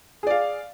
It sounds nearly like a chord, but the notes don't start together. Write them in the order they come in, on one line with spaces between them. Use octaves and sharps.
G#4 D5 F5